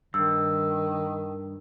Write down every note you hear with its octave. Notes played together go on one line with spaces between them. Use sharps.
G2 D#3 E6